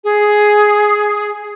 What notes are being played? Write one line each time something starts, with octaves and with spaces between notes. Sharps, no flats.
G#4